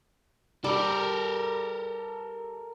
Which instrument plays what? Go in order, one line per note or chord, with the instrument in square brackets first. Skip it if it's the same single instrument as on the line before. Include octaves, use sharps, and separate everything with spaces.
[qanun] G3 [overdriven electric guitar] A4 A#4